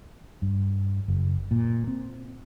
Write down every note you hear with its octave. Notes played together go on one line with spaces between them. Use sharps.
G2
F#1
A#2
C4